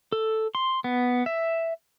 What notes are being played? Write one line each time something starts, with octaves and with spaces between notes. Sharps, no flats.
A4
C6
B3
E5